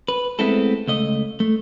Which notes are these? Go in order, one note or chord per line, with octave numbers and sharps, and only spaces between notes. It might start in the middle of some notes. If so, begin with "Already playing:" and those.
B4
G#3 A3 B3 C4 E4 A4
C#2 A3 D#5
A3